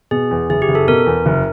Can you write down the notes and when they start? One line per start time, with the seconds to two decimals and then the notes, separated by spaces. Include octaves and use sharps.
0.11 B2 G#4
0.31 E2
0.50 F#1 G#4
0.62 G4
0.69 F#1
0.75 A4
0.88 B2 A#4
1.06 E2
1.26 F#1